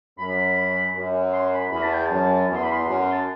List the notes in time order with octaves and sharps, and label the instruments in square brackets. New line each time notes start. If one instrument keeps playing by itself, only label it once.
[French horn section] F#2 [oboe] B5
[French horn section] F#2
[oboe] C6
B5
[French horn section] E2 [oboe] B5
[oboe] A5
G5
[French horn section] F#2 [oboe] A5
[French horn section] E2
[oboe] C6
B5
C6
[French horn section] F#2
[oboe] A5